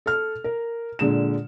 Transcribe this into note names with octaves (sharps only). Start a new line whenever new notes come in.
A4 F6
A#4
A#2 D3 G#3 E7